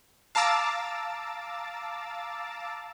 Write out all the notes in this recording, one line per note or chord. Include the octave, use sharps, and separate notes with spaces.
F5 A5 A#5 D6 E6 A6